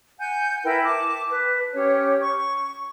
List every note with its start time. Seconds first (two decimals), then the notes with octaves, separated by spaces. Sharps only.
0.19 F#5 G#5 G6
0.64 E4 A#4 B4 G5
0.83 A5 D6
1.30 B4
1.74 C#4 G4 C#5
2.22 C#6